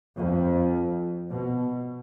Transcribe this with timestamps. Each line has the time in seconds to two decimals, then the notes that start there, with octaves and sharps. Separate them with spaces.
0.17 F2
1.30 B2